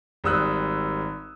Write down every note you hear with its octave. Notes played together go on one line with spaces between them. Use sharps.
G#1 G3 D#6 E6 F#6